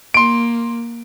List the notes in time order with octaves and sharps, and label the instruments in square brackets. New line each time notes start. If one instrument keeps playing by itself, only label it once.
[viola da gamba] A#3 [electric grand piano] C6 D7